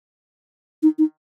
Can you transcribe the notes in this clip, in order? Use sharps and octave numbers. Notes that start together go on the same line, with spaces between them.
D#4
D#4